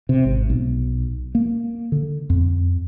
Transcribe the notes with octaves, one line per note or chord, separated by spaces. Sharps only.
C3
G#1
B1
A#3
D3
F2